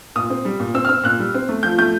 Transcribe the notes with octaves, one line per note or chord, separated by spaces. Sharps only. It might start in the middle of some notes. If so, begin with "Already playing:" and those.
A#2 D#6
C4
G3
A#2
C4 E6
F6
C4 E6
A#2 F#6
G3
C4
A3
F3 G6
A3 G6